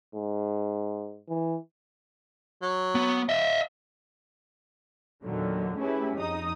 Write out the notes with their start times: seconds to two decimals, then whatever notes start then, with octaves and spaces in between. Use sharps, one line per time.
0.14 G#2
1.28 E3
2.62 F#3
2.95 B3
3.29 D#5 E5
5.24 E2 A#2 D3 D#3 F#3
5.78 A3 C#4 E4 G4 G#4 B4
6.17 F2 D#4 D#6